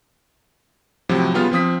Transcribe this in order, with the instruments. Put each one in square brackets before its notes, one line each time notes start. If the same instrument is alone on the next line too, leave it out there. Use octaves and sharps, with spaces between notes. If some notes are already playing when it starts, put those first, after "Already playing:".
[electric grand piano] A2 C3 F3 F#3
C#3 G3 B3 F4 F6
F3 C4 D#6 B6